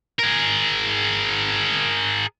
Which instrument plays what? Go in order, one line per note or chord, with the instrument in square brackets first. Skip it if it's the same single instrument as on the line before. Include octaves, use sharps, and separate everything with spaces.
[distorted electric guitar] G#4 A#4